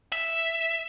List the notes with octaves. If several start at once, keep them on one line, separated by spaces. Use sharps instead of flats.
E5